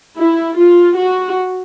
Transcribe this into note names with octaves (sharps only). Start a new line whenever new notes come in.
E4
F4
F#4